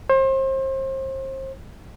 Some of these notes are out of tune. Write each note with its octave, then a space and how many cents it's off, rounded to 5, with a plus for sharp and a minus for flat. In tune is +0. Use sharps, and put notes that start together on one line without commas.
C5 +35